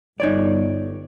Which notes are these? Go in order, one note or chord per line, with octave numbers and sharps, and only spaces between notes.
G1 D#4 C#5 D5